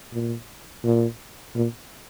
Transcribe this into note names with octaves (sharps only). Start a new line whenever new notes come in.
A#2
A#2
A#2